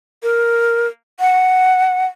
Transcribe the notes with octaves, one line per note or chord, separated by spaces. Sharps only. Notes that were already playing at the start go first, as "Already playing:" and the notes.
A#4
F#5